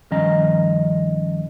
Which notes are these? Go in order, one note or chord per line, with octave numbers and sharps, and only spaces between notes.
G2 D#3 F3 C#4 D#5 A#5